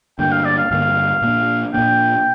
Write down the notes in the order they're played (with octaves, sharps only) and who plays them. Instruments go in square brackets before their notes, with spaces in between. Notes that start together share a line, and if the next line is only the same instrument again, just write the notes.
[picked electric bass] G2 D3 A#3 [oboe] G5
[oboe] F5
D5
F5
[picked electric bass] G2 D3 A#3 [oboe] F5
[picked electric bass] A#2 A#3 D4
[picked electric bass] A#2 A#3 D4 [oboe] G5